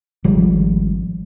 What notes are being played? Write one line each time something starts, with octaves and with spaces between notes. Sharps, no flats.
G#1 F3 G3